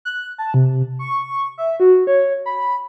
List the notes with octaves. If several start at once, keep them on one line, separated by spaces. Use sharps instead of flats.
F#6
A5
C3
C#6
E5
F#4
C#5
B5